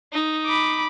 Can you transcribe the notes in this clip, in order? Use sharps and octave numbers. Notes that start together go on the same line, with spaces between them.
D#4
B5 D6